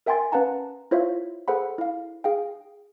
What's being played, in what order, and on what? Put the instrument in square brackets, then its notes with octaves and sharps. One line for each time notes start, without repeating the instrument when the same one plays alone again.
[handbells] A#4 E5 G5 G#5 C6 A6
C#4 B4 F5 F#5 A5 A#5
E4 F4 C5 C#5 E5 F5
G#4 A4 C5 F#5 B5
E4 F5
G#4 F5 G5